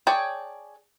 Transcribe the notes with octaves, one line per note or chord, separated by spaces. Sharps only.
G#4 C#5 D5 G5 A5